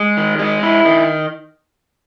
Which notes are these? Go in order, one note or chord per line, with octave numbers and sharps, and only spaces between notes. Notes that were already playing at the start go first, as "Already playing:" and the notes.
Already playing: G#3
D#3
G#3
E4
D#3